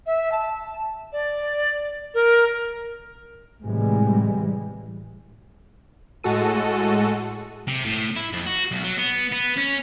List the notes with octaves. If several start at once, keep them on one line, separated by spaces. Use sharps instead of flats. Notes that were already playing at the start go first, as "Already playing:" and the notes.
E5
A5
D5
A#4
A2 C3 E3 G3 G#3
A2 G#3 F#4 A4 D#7
C3
A2
E4
F2
F#4
B1
F#3
B3
B3
C#4